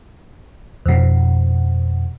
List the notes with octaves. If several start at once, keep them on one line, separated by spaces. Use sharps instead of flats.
F2 B2